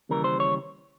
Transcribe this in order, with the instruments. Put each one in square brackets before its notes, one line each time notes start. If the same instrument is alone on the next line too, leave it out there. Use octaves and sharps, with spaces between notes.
[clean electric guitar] D#2 C#3 E3 G3 A#4
C5
C#5